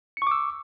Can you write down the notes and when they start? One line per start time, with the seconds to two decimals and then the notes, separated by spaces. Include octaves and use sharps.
0.17 C#7
0.22 C#6
0.27 D6
0.31 E6